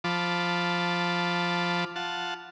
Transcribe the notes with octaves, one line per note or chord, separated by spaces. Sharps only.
F3 F4 A5 B5 D6
F4 F#5 A5